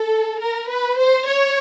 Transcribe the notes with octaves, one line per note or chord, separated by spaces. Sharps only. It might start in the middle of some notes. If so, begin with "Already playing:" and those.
Already playing: A4
A#4
B4
C5
C#5